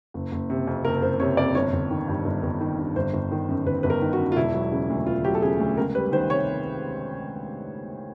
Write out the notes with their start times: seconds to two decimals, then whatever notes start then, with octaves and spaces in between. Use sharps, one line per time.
0.14 F#1
0.32 F#1
0.50 C3
0.67 F2
0.85 F#1 A#4
1.02 F#1 C5
1.20 C3 C#5
1.37 F2 D5
1.55 G1 C#5
1.73 G1
1.90 D#3
2.08 G2
2.25 G1
2.43 G1
2.61 D#3
2.78 G2
2.96 G1 C5
3.13 G1
3.32 D#3
3.49 F#2
3.66 G1 B4
3.83 G1 B4
3.90 A#4
4.02 D#3
4.13 F#4
4.19 F#2
4.32 F4
4.36 E1 E4
4.54 F#3
4.72 C#3
4.90 D2
5.06 E1 F4
5.24 F#3 G4
5.35 A4
5.42 C#3 G#4
5.60 D2
5.77 C#2 A#4
5.95 G3 B4
6.12 D#3 C5
6.30 C3 C#5